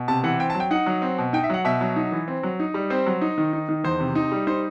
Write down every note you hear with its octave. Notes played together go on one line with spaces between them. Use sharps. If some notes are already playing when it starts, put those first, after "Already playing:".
Already playing: B2
C3 A5
E3 F#5
C4 G5
A5
F#3
G5
D#4 F#5
F#3
C4
B2
D#4 G5
E5
F#3 F#5
B2 E5
F#3
D#4
E3
C4
F#3
D#4
G3
C4 C5
F#3
D#4
D#3
D#4
D#3
E2 C5
C3
D#4
G3
D#4 C5